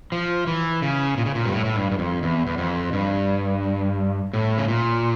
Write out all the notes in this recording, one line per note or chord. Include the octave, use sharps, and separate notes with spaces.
F3
E3
C#3
A#2
C#3
A#2
G2
A2
A2
G2
G2
F2
E2
E2
F2
G2
A2
C#3
A#2